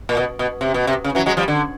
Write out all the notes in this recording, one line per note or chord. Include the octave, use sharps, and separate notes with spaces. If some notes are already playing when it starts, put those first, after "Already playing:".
A#2
B2
B2
C3
B2
C3
C#3
E3 F#3
F#3 G#3
F3 G3
D3